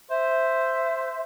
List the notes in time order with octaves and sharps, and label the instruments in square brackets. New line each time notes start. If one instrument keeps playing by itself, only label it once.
[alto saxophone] C5 [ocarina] E5